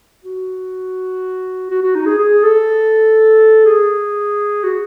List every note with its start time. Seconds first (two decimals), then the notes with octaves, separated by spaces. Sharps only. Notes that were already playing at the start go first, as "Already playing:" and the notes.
0.24 F#4
1.70 F#4
1.82 F#4
1.95 D#4
2.06 G#4
2.19 G#4
2.43 A4
3.65 G#4
4.63 F#4